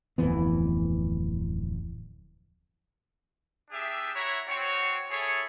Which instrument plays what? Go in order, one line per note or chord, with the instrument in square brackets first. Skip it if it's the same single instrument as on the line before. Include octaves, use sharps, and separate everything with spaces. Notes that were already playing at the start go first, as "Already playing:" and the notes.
[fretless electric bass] D1 F2 E3 B3
[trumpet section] D4 G4 G#4 E5
E4 C#5 E5 F#5 A#5
C4 F#4 C#5
E4 G#4 A4 C#5